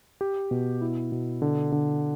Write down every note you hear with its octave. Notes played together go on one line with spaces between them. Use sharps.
G4
B2
E4
B2
D3
D3